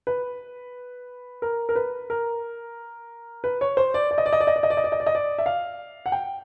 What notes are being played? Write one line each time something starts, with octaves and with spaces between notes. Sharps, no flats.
B4
A#4
A#4
B4
A#4
B4
C#5
C5
D5
D5
D#5
D5
D#5
D5
D#5
D5
D#5
D5
D#5
D5
D#5
D5
D#5
D5
E5
F5
F#5
G5